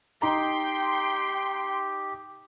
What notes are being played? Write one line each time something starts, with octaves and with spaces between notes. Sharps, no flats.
D#4 G4 G5 A#5 C6